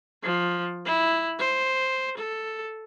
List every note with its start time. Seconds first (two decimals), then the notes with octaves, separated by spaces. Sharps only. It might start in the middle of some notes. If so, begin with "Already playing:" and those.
0.23 F3
0.85 E4
1.39 C5
2.18 A4